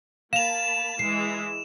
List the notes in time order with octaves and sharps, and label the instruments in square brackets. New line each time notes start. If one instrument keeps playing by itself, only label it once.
[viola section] A#3 A5 B5 [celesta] F5 [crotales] E7 F7
[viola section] E3 G#3 E4 [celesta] C7